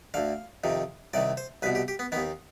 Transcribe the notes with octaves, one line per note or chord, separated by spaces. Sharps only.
D2 D3 F5
F2 C3 D#3
C2 C3 D#3 D5
C5
C2 B2 B4
G4
G4
B3
D#2 D#3 B3